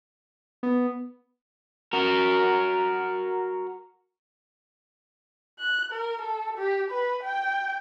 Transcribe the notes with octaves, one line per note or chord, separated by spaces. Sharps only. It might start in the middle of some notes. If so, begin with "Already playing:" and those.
B3
F#4 A#4
F#6
A#4
A4
G4
B4
G5